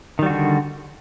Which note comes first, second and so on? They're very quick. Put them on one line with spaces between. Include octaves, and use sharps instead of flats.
D#3 G3 F#4 D3